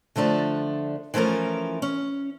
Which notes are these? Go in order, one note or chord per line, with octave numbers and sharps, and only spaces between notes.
D3 F3 A3 D4
E3 F3 A3 C#4 A#4
C#4